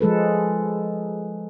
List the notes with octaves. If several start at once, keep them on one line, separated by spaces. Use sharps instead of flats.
F3 G#3 A4 B4